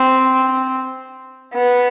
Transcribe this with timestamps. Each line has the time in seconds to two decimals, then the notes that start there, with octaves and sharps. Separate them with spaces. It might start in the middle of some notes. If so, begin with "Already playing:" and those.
Already playing: C4
1.54 B3